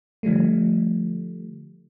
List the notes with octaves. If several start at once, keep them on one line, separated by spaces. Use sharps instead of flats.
D3 F3 G3 A3